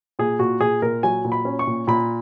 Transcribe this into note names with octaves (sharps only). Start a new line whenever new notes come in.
A#2 G#4
A#2 F#4
A#2 G#4
A#2 A#4
F#3 G#5
A#2
B5
C#4
C#6
A#2
A#2 B5